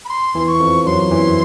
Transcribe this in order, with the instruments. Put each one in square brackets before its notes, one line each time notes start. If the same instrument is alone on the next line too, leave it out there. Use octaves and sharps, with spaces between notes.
[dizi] B5
C6
[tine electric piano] E2 E3
[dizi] C#6
[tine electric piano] F2 F3
[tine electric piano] F#2 F#3 [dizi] C6
[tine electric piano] E2 E3